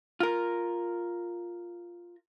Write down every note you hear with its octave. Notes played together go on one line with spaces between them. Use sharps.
F4 A#4